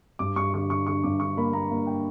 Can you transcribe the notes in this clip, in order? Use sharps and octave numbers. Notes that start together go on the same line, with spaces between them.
G2 D6
G2 C#6
D3 C#6
D3 C#6
D3 C#6
G2 D6
D3 C#6
A#3 B5
A#3 A#5
A#3
G5